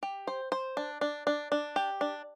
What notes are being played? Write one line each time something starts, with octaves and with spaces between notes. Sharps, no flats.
G4
C5
C5
D4
D4
D4
D4
G4
D4